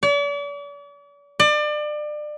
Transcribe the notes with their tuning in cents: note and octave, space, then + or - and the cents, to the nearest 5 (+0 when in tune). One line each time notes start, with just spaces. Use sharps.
D5 -45
D5 +30